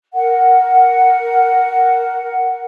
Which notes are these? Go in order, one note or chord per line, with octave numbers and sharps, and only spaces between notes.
A#4 F#5